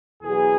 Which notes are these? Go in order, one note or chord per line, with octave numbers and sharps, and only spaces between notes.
E2 B2 F#3 B3 G#4